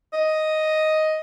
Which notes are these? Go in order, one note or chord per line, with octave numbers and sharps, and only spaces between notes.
D#5